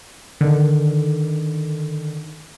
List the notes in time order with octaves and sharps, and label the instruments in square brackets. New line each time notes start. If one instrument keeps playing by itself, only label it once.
[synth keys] D3 D#3